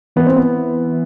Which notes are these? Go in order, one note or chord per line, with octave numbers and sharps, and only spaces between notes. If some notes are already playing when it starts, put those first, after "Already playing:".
E3 B3
C4
B3